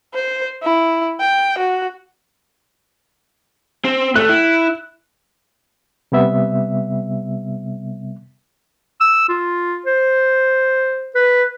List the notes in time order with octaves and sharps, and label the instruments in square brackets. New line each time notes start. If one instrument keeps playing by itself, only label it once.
[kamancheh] C5
E4
G5
F#4
[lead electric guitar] C4
[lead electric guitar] A3 [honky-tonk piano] F#6
[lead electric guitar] E4
[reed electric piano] C3 G3 B3 E5
[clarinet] E6
F4
C5
B4